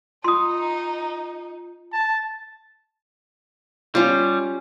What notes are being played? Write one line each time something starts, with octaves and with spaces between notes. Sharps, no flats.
D#4 F4 C6 D#6
A5
G3 C#4 F4